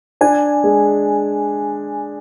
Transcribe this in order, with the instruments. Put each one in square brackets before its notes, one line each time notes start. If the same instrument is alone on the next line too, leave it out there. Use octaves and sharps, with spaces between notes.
[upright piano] D4 [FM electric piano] G#5
[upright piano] G#3